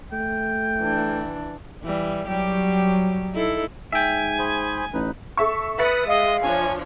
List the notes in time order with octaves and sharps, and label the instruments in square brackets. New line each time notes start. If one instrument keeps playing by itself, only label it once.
[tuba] A3 [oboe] G5
[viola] E3 D4
[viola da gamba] E3 G3
[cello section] F#3 [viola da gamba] G3 G4
[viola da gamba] D#4 E4 A4
[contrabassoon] G#2 [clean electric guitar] E5 G5 [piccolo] G#5
[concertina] G#4 C5 B5
[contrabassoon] A1 [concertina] D#4 B4
[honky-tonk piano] A4 E5 C#6
[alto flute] B4 [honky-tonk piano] E5 A6 C#7 [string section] B5 D#6
[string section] G#3 [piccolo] D#5 [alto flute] F5
[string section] F3 D4 C#5 [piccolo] G#5